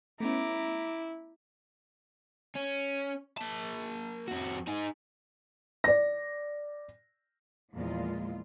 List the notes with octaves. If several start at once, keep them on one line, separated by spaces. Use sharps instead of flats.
A3 B3 C#4 E4 A#5 D6
C#4
A#3 A5
F2 F#4
D#4 G#4
D5 A#6
E2 A#2 F3 G#3 F4